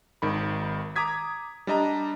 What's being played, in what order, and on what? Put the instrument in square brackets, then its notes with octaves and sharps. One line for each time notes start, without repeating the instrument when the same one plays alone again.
[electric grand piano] G#1 D#3 B5
A#5 D6 D#6 G#6 B6
G3 D4 D#5 A#5